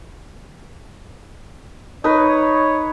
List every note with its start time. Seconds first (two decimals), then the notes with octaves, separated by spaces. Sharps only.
2.04 D#4 B4 C#5